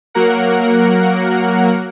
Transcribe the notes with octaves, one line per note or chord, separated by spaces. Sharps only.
F#3 A#3 A#4 F#5